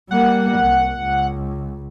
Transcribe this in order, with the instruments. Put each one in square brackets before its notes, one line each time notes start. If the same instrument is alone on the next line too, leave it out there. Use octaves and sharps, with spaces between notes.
[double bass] G3 A#3 [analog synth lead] F#5
[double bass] C2
C#2